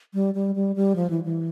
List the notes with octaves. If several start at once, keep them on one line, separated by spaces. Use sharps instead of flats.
G3
G3
G3
G3
F3
E3
E3